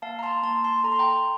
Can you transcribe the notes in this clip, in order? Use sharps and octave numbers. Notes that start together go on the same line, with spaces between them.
A#3 F5 A5
A#5
A5 C6
A#3 A5 C6
A5 C6
A4 A#5
C6
G5 A#5